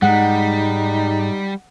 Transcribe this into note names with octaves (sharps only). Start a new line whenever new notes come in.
G#2 G3 G#3 D#4 F#5